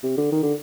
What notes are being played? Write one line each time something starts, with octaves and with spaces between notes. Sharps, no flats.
C3
D3
D#3
D3